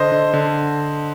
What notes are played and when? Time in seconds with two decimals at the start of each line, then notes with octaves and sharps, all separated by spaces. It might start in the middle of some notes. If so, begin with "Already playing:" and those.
Already playing: D3 C5 D#5
0.12 D3
0.33 D3